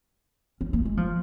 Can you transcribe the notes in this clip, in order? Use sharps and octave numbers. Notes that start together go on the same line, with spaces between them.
C#4
A#3
G#3
F3